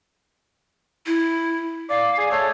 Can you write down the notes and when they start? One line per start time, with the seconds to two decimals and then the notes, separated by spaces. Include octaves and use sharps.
1.06 E4
1.90 D5 F5
2.18 G#4
2.31 A3 C#5